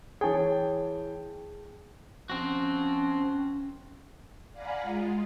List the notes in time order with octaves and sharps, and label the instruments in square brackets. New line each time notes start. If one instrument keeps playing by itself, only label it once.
[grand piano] E3 C#5 G5 [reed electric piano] G#4 A5
[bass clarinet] F3 [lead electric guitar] C4 F#4 [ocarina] C#4
[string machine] D5 F5 F#5 G#5 A#5 B5
G#3 F4